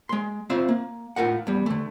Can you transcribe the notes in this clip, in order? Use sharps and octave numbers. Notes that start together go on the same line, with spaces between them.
G#3 C6
C4 F4 C5 E5
A#3
A2 F4 A#4 F#5
E2 G3
D3 A3